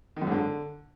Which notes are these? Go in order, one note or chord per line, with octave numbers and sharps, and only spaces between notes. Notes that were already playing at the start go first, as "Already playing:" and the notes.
D#3
F#2
G#2
D3